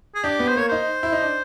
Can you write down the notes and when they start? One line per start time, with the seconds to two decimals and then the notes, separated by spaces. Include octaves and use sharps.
0.15 G#4
0.24 D4 G4
0.39 B3
0.48 C5
0.56 A#3 C#5
0.69 D#4 C5
1.03 E4
1.12 D#4
1.22 D4